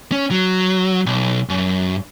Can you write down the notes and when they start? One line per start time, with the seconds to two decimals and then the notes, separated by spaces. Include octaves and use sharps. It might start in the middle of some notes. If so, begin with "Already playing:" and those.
0.12 C#4
0.31 F#3
1.06 B1
1.49 F#2